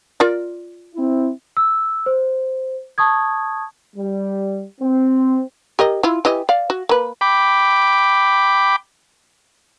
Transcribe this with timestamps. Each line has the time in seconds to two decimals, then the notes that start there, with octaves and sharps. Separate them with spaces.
0.20 F4 A#4 D5
0.95 C4 E4
1.57 E6
2.06 C5
2.98 A5 C#6 D#6 G#6
3.96 G3
4.81 C4
5.79 G4 A#4 D#5
6.03 E4 F4
6.25 E3 G4 D#5
6.49 D5 F5
6.70 F#4
6.89 A#3 B4
7.21 G5 B5 D6